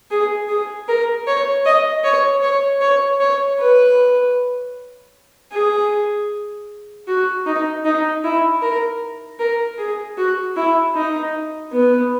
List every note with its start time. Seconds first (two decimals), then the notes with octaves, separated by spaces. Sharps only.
0.11 G#4
0.49 G#4
0.88 A#4
1.27 C#5
1.65 D#5
2.04 C#5
2.42 C#5
2.81 C#5
3.20 C#5
3.59 B4
5.52 G#4
7.07 F#4
7.46 D#4
7.85 D#4
8.24 E4
8.62 A#4
9.39 A#4
9.78 G#4
10.18 F#4
10.56 E4
10.95 D#4
11.72 B3